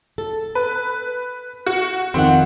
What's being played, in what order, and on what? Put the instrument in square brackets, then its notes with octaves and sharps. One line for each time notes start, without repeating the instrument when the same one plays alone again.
[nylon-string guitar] A4
[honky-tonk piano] B4
F#4
[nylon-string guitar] F2 D#3 F#5 [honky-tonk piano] C4